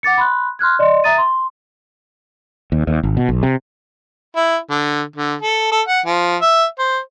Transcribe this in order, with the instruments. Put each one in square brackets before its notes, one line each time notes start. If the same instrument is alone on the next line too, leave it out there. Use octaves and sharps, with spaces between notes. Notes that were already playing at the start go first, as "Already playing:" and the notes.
[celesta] F#5 D6 A6 C#7
B5 C6 F#6
C6 F6 F#6 G#6
D5 D#5 C6
E5 A#5 D#6 A6 D#7
C6
[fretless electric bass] D#2
D#2
G#1
B2
B1
C3
[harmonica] E4
D3
D3
A4
A4
F#5
F3
E5
C5